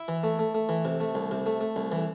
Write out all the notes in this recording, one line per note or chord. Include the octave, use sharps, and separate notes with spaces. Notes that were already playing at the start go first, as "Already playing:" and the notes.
Already playing: E4
E3
A3
A3
A3
E3
C3
A3
C2
C3
A3
A3
C2
E3